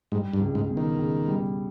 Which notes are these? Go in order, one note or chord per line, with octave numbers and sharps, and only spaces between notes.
G#2 G3
G2
C#2
G#2
B2
D#3
C#2
G3